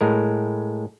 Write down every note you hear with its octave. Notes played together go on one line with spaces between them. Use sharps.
A2 G#3 A#4